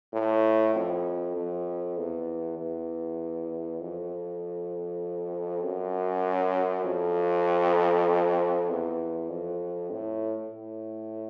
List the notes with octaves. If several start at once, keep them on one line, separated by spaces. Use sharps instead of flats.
A2
F2
F2
E2
E2
F2
F#2
F2
E2
F2
A2
A2